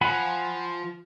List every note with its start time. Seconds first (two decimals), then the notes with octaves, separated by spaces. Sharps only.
0.01 F3 F#5 G#5 B5